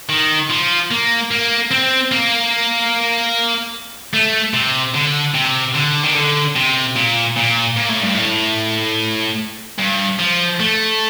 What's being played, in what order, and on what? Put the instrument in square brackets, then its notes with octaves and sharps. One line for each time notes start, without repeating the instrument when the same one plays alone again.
[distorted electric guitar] D#3
F3
A#3
A#3
C4
A#3
A3
C3
D3
C3
D3
D#3
D3
C3
A#2
A#2
A#2
A2
G2
A2
G2
F3
A3